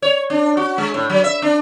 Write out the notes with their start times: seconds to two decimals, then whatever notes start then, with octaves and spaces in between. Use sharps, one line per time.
0.02 C#5
0.30 D4
0.57 F#4
0.78 G#3
0.94 A2
1.10 F#3
1.24 E5
1.42 D4